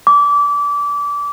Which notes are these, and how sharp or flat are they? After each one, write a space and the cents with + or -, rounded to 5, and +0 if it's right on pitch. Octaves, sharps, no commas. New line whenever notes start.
D6 -25